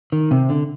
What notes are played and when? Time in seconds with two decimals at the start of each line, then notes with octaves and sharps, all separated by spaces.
0.12 D#3
0.31 C3
0.49 D3